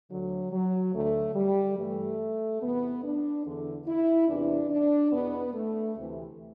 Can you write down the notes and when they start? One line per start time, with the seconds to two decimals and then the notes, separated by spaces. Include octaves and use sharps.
0.10 D2 D3 F#3
0.52 F#3
0.94 D2 D3 A3
1.35 G3
1.78 G2 E3 A3
2.61 E2 C3 E3 B3
3.04 D4
3.46 E2 D3
3.87 E4
4.28 E2 C3 E3 D4
4.70 D4
5.11 E2 B2 B3
5.54 A3
5.95 D2 C3 E3